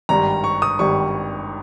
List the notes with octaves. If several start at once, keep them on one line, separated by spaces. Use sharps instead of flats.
G#1 G2 G3 A#5
C#6
D#6
G#1 G2 G3 C#6